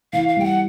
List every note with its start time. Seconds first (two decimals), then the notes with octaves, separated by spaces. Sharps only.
0.13 E3 F5
0.28 F5
0.37 G3 G5
0.44 F#5